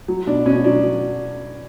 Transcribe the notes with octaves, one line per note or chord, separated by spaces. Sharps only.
F#3
B2 D4
B2 C#4
F#3 D4
F#3